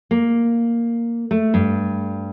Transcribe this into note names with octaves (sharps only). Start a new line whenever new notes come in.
A#3
A3
G2